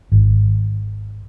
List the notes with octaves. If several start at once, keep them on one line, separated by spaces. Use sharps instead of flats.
G#1